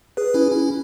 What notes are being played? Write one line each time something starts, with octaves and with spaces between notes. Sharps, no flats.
G#4 B4
C#4 E4
C#4 E4